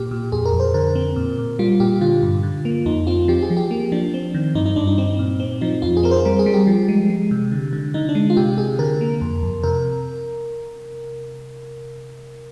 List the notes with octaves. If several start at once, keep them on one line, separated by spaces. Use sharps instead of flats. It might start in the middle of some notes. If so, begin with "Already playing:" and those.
Already playing: A#2 G4
A#2
F2 G#4
A#4
F2
C5
D3 A#4
C4
A#2
A#2
G3 F4
A#2 G4
D3 F4
G2
D3
A#3
F2 D#4
C4 F4
F3 G4
G#4
F3
G4
A#3
F3 D4
C4
D#3
G2 D#4
D#4
G2 D4
D#4
C4 D#4
A#2
C4
F3 D#4
F2 F4
G#4
C4 A#4
C5
G3 A#4
G#4
G3
G4
F3
G#3
G#3
C3
D3
D3
D3 D#4
D4
G#3
F4
C3 G4
C3 G#4
D3 A#4
A#3
F2
F2
C3 A#4